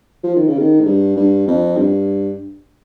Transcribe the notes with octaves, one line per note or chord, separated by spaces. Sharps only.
F3
D#3
C#3
D#3
G#2
G2
G2
F2
G2